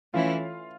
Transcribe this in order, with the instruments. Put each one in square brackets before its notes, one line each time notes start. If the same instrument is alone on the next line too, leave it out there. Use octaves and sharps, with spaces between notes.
[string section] E3 A3 C#4 E4 [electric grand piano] F4 F5